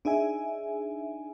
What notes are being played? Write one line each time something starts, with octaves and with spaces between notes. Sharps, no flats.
D4 D#4 G#4 E5 G#5